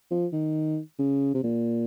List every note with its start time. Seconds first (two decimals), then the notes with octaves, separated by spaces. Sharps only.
0.11 F3
0.33 D#3
0.99 C#3
1.34 C3
1.43 A#2